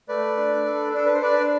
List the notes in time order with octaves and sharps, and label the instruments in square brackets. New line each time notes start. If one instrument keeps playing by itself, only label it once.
[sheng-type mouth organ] A3 B4 D5
D4
A4
D4 A4
B4
C5
D4 B4 D5